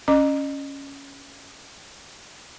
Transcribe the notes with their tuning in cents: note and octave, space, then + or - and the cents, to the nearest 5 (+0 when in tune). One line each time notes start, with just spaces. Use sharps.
C#4 +0 D#5 -30 D6 +5